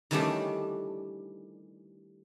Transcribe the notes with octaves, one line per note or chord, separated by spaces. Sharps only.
D#3 E3 G3 A3 C#4 D4